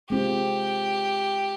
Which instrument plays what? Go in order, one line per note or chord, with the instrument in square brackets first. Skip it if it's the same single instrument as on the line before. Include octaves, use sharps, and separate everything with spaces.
[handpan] G#3 C4 F4 [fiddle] G4